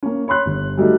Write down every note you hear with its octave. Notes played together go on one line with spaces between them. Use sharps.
A#3 C#4
C#5 B5 C6 F#6
G1
F#3 G3 A3 D#4